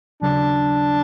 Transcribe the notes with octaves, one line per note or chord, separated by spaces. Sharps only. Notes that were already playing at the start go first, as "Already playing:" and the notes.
D#2 C#3 F#3 D4